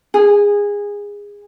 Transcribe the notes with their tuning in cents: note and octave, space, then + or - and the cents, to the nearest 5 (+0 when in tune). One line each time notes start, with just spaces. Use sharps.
G#4 -20